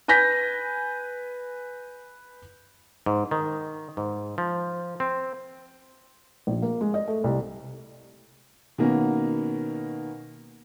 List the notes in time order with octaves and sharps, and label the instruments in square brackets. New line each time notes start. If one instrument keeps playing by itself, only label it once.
[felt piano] B4 G#5 G6 A#6 B6
[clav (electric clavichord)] G#2
D#3
G#2
F3
C4
[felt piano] A#1
A#3
G#3
D#5
A3
C2
[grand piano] B2 D#3 A#3 B3 C#4